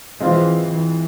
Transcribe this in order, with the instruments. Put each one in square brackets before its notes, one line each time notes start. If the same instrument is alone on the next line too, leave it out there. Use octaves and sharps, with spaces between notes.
[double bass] E3 [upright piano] G#3 C4 F4
[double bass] E3